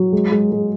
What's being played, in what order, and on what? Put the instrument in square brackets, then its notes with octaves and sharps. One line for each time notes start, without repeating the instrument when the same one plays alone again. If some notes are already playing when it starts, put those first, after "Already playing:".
Already playing: [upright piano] F#3
G#3
G#3
G#3